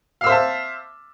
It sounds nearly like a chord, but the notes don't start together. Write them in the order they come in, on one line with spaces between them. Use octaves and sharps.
F5 E6 C5 E5 A5